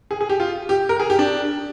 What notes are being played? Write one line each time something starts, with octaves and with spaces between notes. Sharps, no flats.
G#4
G#4
G4
F4
G4
A#4
G#4
G4
D4